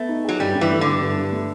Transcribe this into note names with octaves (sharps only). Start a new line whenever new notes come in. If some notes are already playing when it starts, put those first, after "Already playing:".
Already playing: A3 B3
D#4
F#3 G#4
G2 G3
G2
E3
A3
D3
G2
G2
G2
A3